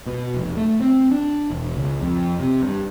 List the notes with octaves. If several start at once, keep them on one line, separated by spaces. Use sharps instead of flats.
B2
F1
A3
C4
D4
E1
C#2
F2
C3
G2